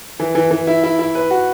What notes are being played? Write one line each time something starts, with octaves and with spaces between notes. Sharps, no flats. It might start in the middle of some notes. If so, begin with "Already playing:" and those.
E3
E3
E3
E4
E4
E4
B4
F#4